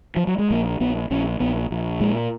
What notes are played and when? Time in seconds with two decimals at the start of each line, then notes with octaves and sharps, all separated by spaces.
0.16 F3
0.27 F#3
0.38 G#3
0.50 A#1 A#3
0.80 A#1 B3
1.10 A#1 C#4
1.40 A#1 B3
1.71 A#1
2.00 A#2 G#3